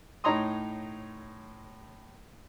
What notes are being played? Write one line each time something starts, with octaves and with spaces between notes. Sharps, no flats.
A2 D#4 C#5 A#5 C6 D#6